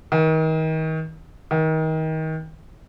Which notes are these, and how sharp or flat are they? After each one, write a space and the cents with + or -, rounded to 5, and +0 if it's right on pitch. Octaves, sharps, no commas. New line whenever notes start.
D#3 +35
D#3 +30